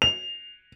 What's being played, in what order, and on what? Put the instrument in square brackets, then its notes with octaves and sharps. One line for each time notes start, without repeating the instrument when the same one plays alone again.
[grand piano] F7